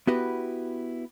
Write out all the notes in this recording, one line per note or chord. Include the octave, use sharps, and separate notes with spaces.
B3 E4 F#4 G4 B4